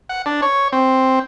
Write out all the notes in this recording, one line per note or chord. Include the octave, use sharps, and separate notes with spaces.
F#5
D4
C#5
C4